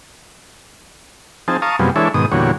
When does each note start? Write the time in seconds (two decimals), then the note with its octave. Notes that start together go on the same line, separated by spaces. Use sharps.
1.48 F3 C4 D#4 G#4 A5
1.62 F5 A5 A#5 C#6 D#6
1.79 F#2 C3 F3 G3 G#3 B3
1.96 E3 G#3 D4 A4 C#5 E5
2.14 G#2 B2 D#3 D#6
2.32 E2 A#2 D3 G3 F#4 C#5